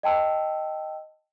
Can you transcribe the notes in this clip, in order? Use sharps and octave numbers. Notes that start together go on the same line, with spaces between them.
D#5 G5 A5 E6